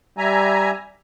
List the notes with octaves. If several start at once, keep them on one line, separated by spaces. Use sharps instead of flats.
G3 E5 G#5 A#5